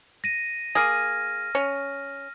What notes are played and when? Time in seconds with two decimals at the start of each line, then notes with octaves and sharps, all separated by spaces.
0.24 A#6 D#7
0.75 A#3 G#4 F6 A#6
1.55 C#4